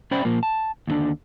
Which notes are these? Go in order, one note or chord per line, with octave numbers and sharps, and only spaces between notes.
C#4 C5 D5 E5 G5 B5
A#2 F3 A#3
A5
D#2 A2 D3 D4